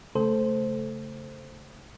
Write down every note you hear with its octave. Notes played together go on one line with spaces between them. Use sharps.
C#3 A3 A4 C5